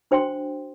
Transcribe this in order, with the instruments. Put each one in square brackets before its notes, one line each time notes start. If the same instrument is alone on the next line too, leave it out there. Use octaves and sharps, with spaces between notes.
[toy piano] D4 F#4 C5 G5 C6